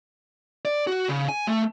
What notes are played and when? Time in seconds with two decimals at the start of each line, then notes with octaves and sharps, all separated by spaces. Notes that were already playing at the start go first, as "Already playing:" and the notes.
0.65 D5
0.87 F#4
1.09 C#3
1.29 G#5
1.47 A3